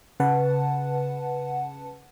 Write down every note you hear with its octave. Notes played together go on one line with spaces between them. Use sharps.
C#3 B4 F#5 A5